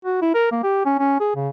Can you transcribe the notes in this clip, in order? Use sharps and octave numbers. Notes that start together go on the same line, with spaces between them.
F#4
E4
A#4
A#3
G4
C#4
C#4
G#4
C#3